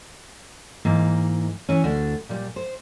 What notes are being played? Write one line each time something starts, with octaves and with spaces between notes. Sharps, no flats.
G#2 E3 A#3
E3 C#4
D2 D4
A#2 G3
C5